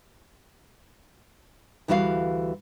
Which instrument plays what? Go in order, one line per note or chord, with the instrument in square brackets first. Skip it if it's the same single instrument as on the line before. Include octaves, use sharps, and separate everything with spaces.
[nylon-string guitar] D2 E3 G3 F#4 D#5 F5